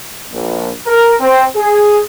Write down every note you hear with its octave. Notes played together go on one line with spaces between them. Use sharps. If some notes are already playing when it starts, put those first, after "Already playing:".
A#1
A#4
C4
G#4